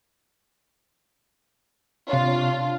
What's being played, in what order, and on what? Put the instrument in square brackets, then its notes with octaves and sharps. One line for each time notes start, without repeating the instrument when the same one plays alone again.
[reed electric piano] C3 C#5 [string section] D4 F4